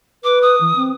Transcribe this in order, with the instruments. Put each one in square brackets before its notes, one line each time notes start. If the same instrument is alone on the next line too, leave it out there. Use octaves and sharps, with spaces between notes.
[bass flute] B4 [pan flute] D6
[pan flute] D#6
[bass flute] E3
C4